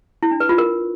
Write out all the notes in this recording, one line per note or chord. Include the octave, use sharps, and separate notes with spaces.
E4
D4
B4
F4
A#4